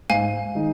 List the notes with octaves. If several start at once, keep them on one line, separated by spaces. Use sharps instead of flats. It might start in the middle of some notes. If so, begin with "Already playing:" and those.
G#2 F5 G#5
D#3 G#3 D#4